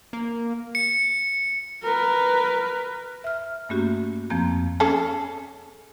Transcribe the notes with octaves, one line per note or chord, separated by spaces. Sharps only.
A#3
C#7
A#4 B4
E5 F6
G2 A3 A#3 C#4 F#4 G4
F2 F3 A#3 C4 A#5 G6
C#4 G#4 A4